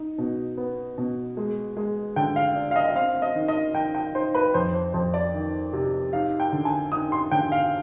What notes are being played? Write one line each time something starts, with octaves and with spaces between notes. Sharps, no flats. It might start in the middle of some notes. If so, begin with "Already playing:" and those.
Already playing: D#4
B2
B3
B2
G#3
G#3
D3 G5
F5
D4
F5
D#5
D#5
C4 F5
F5
D#5
D#3
D#5
D#3 G5
G5
D#4 C5
B4
F2 C5
C5
F2 C5
D5
D#3
C3
D#4 F5
G5
D3
G#5
D#4 D#6
C6
D3 G5
F5